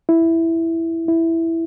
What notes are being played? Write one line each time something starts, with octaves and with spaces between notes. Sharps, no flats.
E4
E4